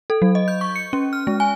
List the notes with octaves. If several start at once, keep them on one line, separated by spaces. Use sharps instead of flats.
A4
F#3
D#5
G6
C#6
C#7
C#4
F6
G#3
G#5